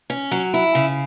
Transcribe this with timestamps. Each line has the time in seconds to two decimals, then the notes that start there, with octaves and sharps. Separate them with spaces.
0.10 C#4
0.31 F#3
0.54 E4
0.75 C#3